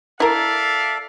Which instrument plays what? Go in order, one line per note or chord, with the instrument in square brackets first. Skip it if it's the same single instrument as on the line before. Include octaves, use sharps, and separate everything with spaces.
[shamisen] E4 A#4 [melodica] A4 [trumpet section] D5 E5 F5